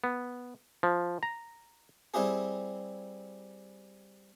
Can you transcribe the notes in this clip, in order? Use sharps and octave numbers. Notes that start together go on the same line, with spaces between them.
B3
F3
A#5
G3 C4 E4 G4 G#4